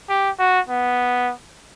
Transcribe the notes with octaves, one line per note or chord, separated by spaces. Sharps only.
G4
F#4
B3